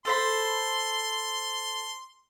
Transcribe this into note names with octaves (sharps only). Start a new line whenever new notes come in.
A4 C5 B5 C6